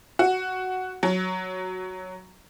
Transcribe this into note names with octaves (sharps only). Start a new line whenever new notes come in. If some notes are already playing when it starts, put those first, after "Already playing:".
F#4
F#3